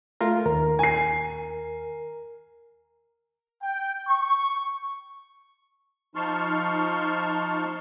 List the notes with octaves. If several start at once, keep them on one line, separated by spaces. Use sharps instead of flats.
A3 F4 A#4
D#2 A#4
G#5 C7
G5
C#6
F3 D#4 A5 C6 C#6 F6